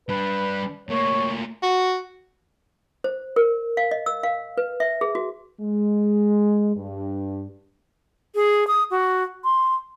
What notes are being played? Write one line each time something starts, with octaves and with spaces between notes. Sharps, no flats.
G3 D4 B4
A2 A#3 C#5
F#4
C5
A#4
F5
D#5
E6
F5
B4
E5
G#4
F#4
G#3
G2
G#4
D#6
F#4
C6